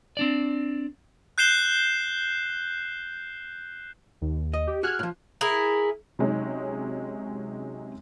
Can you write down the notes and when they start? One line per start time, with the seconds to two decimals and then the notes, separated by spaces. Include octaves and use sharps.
0.17 C4 D4 D5
1.38 F#6 G6 C7 E7 G7
4.22 D#2
4.54 D#5
4.67 G4
4.83 F#4 G#4 F6 F#6 G#6
4.99 A2 F3
5.41 E4 G#4 A#4
6.19 C3 F#3 G#3 C#4 D#4